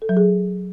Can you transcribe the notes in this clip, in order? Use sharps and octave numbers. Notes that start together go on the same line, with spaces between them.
A4
F#3
G#4